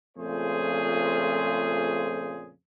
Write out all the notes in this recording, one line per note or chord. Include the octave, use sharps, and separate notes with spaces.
F2 A#2 C#3 A3 G#4 C5